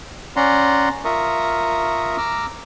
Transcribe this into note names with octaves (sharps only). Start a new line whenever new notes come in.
C#4 D5 F#5 A#5 C6
F4 A#4 E5 A#5 C#6 D#6
A#5 D6 E6 F6